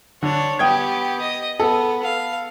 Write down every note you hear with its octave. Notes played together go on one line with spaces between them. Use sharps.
D3 D4 C#5
B3 G4 G5 D#6 G#6
D#5
B3 A4
F5